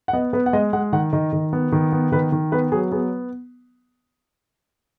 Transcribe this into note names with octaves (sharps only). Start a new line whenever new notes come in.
F#5
B3 D#5
B3 B4
F#5
G#3 D#5
G#3 F#5
D#3 F#5
D#3 D#5
D#3
B3
D#3
B3
D#3 B4
D#3
B3 B4
F#3 G#4
B3 G#4